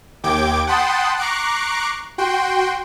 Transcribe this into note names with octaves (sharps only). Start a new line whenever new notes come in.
D#2 G5 D6 G#6 D7
F#5 G5 A5 B5 C6 D#6
A#5 C#6 D6 F#6 C7 D7
F#4 G5 C6